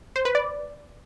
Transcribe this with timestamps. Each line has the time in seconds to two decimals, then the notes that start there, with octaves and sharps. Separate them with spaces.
0.16 C5
0.25 B4
0.35 D5